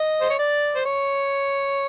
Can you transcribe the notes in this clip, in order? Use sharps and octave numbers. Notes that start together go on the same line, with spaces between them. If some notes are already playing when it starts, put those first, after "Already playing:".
Already playing: D#5
C5
C#5
D5
C5
C#5